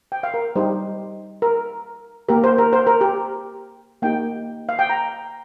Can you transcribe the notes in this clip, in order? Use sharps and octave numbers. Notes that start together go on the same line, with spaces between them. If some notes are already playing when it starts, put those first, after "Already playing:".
G5
F5
A#4
G3 D#4 G4 C5
A#4
A#3 G4 A#4
C5
A#4
C5
A#4
G4
A#3 D#4 G4 G5
F5
G5
A#5